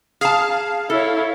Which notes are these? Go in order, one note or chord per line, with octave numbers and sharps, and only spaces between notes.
G#4 F5 A5
E4 A4 C#5